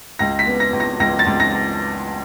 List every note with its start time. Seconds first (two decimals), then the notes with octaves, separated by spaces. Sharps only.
0.19 C#2 A#6
0.39 B6
0.45 B3
0.60 A#6
0.73 C#2
0.80 A#6
1.00 C#2 A#6
1.19 A6
1.26 C#2
1.40 A#6